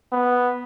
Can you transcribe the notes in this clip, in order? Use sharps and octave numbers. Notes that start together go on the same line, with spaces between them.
B3